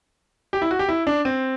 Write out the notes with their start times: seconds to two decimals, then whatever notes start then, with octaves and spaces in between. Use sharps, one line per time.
0.53 G4
0.62 E4
0.71 F#4
0.79 G4
0.89 E4
1.07 D4
1.25 C4